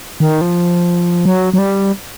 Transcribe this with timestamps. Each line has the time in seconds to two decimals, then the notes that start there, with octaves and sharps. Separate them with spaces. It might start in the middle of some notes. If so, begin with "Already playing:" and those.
0.20 D#3
0.41 F3
1.25 F#3
1.54 F#3
1.58 G3